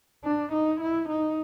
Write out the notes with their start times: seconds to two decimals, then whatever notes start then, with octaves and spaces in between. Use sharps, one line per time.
0.24 D4
0.52 D#4
0.81 E4
1.09 D#4